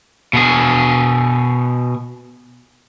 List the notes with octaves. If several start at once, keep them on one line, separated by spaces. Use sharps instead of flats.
B2 G#4